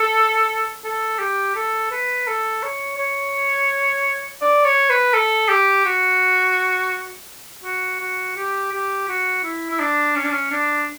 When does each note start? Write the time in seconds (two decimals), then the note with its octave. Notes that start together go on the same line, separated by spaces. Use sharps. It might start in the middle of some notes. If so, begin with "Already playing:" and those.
Already playing: A4
0.84 A4
1.19 G4
1.55 A4
1.92 B4
2.27 A4
2.63 C#5
2.98 C#5
4.42 D5
4.65 C#5
4.89 B4
5.14 A4
5.49 G4
5.85 F#4
7.64 F#4
8.00 F#4
8.37 G4
8.72 G4
9.08 F#4
9.44 E4
9.70 E4
9.80 D4
10.16 C#4
10.23 D4
10.31 C#4
10.52 D4